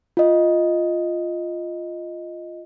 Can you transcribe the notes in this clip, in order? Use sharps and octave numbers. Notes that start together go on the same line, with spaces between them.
F4 D#5